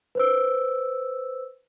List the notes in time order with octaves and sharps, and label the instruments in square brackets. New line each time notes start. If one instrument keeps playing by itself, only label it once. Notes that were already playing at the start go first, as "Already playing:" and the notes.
[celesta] B4 C5 E6